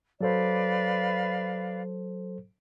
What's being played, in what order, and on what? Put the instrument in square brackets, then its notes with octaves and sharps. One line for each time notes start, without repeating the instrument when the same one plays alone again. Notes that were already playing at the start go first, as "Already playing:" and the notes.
[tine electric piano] F#3 A4 C5 [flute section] B4 D5 F5